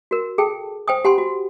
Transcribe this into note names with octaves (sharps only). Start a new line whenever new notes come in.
F#4 A#4
G#4 A4 G5 A5
C5 G5 G#5 D#6
G4 F#5 G#5 B5 C6
F#4